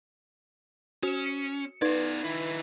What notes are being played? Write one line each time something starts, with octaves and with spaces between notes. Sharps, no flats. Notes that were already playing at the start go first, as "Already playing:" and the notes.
C#4 F#4 E7
C#7
B3 D#4 B4 D5 G#6
D#3 E4